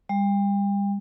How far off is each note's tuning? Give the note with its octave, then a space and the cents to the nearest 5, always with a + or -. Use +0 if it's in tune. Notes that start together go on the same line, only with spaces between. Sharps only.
G3 +35